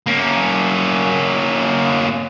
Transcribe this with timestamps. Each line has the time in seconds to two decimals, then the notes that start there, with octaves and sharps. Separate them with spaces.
0.07 A#3 C#4